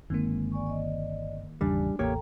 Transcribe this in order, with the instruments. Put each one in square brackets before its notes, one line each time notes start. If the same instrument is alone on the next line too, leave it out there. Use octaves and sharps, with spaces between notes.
[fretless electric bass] G1 C4 [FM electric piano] D#3 A#3 [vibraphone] G#3
[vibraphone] D5 G#5 C#6
D5 D#5
[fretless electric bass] G#1 E2 C#3 [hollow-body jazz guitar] G3 D4 [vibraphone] G#5
[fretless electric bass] A1 E2 [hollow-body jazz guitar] A#3 G4 C#5 [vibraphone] A4 G5 A#5